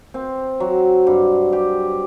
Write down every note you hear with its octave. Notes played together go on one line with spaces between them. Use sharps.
C4
F#3
G2
G4